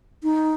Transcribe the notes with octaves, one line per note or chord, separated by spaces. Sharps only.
D#4